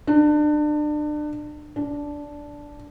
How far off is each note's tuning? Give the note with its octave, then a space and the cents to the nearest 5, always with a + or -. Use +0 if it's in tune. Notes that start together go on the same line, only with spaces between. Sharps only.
D4 +30
D4 -10